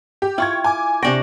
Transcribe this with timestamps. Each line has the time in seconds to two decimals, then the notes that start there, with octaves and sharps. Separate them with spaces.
0.22 G4
0.38 E4 F4 G5 C#6 G#6
0.64 G#5 D6
1.02 C3 D4 G5 C#6 A#6